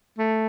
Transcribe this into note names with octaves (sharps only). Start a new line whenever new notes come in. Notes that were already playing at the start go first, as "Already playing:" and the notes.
A3